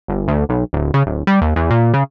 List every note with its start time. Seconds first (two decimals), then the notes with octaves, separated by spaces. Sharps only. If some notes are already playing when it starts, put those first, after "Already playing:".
0.08 G1
0.28 D2
0.49 B1
0.73 D1
0.94 C#3
1.06 D1
1.27 G3
1.42 D#2
1.56 E2
1.70 A#2
1.94 C#3